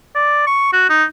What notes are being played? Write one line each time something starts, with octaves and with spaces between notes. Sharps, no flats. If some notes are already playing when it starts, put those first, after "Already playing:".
D5
C#6
F#4
D#4